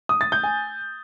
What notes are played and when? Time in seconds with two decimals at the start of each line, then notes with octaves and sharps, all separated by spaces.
0.09 D#6
0.21 A6
0.32 G6
0.44 G#5